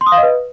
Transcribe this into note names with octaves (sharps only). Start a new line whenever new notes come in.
C6
D#6
F5
D#5
B4